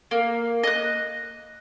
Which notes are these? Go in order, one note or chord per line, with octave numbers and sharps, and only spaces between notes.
A#3
D#5 F#6